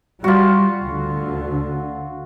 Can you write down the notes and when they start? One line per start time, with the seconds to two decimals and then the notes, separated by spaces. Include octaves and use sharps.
0.24 G3 F4 F#4
0.82 D2 D3